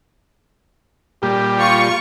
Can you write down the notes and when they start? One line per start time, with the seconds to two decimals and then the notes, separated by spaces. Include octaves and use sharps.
1.23 A#2 G3 G4
1.59 F4 C#6